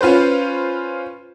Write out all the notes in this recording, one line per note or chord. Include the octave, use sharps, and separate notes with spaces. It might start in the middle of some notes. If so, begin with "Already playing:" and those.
C#4 F4 B4 C5